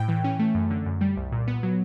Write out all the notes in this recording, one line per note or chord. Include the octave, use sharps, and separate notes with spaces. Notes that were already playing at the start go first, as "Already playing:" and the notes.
Already playing: A2 G5
E3
C#4
A3
F#2
D3
F#2
G3
C2
A#2
B3
F#3